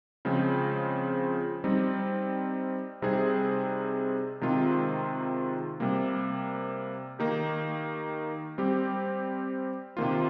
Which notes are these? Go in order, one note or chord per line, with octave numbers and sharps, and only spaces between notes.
C#3 F3 G#3 C4 F4
G3 C4 D#4
C3 G3 C4 D#4 G#4
C3 D#3 G#3 C4 F4
C3 G3 A#3
D#3 A#3 D#4 G4
G3 C4 G4
C3 D#3 A#3 F4